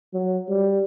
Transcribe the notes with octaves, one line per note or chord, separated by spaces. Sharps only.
F#3
G3